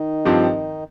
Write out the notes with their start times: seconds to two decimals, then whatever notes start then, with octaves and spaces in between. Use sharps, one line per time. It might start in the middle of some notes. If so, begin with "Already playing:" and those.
Already playing: D#3 D#4
0.25 G2 F3 C4 G4